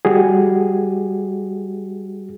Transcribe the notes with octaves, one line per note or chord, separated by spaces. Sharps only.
G3 F#4 G#4